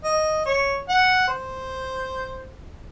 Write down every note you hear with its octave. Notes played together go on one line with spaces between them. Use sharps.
D#5
C#5
F#5
C5